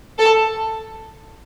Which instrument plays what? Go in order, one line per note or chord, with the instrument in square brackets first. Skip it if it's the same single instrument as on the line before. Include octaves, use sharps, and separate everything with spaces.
[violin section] A4